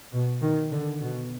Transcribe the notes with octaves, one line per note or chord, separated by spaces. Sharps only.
B2
D#3
D3
B2